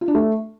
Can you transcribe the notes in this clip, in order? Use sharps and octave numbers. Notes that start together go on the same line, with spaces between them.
F4
D4
A3